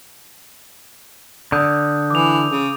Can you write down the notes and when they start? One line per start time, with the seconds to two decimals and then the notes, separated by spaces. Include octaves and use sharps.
1.52 D3 D#6 G6
2.11 E3 D6 F7
2.50 C#3